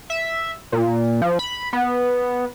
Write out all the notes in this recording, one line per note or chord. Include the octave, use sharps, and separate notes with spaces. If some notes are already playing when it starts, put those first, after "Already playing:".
E5
A#2
F3
B5
B3